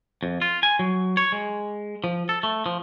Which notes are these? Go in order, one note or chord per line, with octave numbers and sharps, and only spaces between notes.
F2
F4
G#5
F#3
C#5
G#3
F3
A4
A3
F3